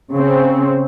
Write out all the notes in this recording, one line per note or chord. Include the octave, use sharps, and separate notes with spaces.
C#3 C4